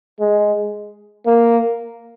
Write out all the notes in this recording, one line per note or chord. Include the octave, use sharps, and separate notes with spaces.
G#3
A#3